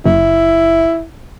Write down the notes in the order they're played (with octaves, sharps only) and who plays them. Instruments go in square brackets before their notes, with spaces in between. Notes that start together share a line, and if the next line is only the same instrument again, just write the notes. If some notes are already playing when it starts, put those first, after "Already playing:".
[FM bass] F#1 [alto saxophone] E4